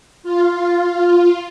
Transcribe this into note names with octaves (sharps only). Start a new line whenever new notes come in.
F4